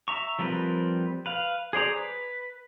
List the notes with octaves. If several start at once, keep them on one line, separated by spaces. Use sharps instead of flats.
E5 A#5 C#6
F3 G3 C4 A#4 B4
B4 F5
G#4 C5 D5 A#5
B4